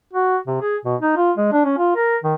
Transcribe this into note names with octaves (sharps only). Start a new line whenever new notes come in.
F#4
C3
G#4
B2
D#4
F4
G#3
D4
C#4
F4
A#4
D#3